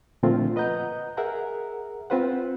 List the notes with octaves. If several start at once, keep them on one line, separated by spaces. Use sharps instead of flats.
A#2 D3 F3 A3 C4 F4
B4 D#5 F#5 A#5 G6
G#4 A#4 E5 F#5 A#5
C4 F4 B4 C5 F#5